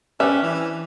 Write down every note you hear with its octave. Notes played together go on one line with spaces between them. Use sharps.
C#4 D4 G4 B4 C5 E5 G5
E3